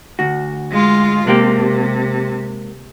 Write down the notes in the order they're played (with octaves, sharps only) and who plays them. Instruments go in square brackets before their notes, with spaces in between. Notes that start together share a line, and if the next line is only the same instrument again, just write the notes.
[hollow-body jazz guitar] D2 F#4
[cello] G#3 F4
[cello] C3 [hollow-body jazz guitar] G#3 A#3 G4